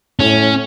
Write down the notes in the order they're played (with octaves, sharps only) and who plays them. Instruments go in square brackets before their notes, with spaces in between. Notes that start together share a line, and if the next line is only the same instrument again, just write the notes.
[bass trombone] A2 [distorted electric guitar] C#4